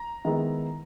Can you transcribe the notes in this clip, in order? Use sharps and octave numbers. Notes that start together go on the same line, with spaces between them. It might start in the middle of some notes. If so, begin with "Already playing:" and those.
Already playing: A#5
D#3 G#3 B3 E4